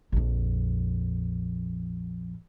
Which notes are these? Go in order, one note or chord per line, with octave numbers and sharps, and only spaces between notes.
A#1 F2